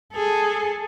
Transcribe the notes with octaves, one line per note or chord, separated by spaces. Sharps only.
G#4 A4